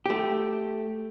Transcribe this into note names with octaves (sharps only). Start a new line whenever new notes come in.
A3 G4